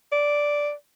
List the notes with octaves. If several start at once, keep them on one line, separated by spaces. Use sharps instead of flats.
D5